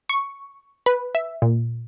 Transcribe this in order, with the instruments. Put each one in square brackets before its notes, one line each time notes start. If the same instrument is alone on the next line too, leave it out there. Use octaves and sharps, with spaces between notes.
[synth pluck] C#6
B4
E5
A#2